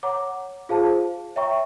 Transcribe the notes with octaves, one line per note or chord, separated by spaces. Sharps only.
C#5 F#5 A#5 D6
F4 G#4 C5 F5 A5
C#5 E5 G5 A#5 C#6